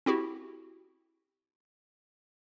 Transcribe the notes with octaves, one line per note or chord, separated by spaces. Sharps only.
C4 E4 F#4 G4